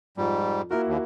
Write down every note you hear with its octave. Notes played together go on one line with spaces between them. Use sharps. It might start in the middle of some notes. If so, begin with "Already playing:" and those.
F2 G#2 G3
F2
A#3 E4 F#4 A#4
D#2